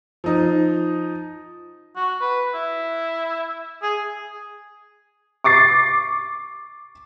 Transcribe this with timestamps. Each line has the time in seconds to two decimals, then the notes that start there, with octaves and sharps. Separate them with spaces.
0.24 F3 D#4
1.96 F#4
2.21 B4
2.54 E4
3.82 G#4
5.44 C#6 D6 A6 C7